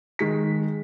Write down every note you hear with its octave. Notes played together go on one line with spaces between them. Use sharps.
D#3 G#3 B6